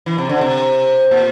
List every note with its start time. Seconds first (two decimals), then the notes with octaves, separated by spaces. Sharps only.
0.06 E3
0.18 C3
0.29 D3
0.41 C3
1.11 A#2